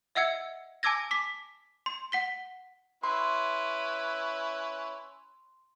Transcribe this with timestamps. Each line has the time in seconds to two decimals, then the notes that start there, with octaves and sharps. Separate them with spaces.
0.15 D#5 E5 F#5 E6 G#6 C#7
0.83 G#5 A5 D6 E6 G#6 A#6
1.11 D6 B6
1.86 C6
2.12 F#5 B6 G7
3.04 C#4 E4 B4 C6